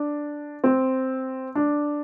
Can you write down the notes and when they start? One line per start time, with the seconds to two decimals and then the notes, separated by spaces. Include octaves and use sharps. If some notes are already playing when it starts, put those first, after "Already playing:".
Already playing: D4
0.64 C4
1.55 D4